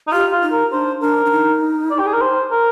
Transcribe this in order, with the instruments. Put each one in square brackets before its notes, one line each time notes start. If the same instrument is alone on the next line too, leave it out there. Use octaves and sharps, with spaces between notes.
[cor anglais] D#4
[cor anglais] F4 [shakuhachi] G4
[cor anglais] F4
[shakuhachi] D#4
[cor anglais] A#4
[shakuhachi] D4 [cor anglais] C5
[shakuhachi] D4 [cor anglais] A#4
[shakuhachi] D4
D#4
[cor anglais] D5
G4
G#4
A#4
C5
A#4